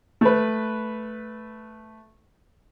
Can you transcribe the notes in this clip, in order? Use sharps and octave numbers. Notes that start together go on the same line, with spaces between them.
A3 B4